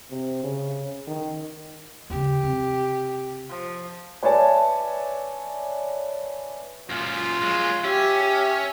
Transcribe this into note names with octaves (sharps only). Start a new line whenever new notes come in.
C3
C#3
D#3
D#2 C#3 G4
C3
F3
B4 C#5 D5 E5 G#5 A5
F#2 A#2 F4
F#3 G#3
C#4 G4 E5
G4